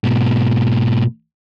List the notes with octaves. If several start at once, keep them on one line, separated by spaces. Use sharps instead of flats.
G#2 B2